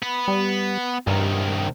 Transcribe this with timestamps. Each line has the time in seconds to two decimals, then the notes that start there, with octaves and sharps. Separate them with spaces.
0.02 B3 B5
0.28 G3
1.07 C2 G2 D#3